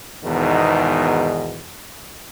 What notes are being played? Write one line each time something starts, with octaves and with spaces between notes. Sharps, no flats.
E2 G#2 B2 D#3